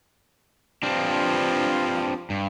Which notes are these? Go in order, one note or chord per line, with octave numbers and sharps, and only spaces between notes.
G2 F3 C4 D4
G2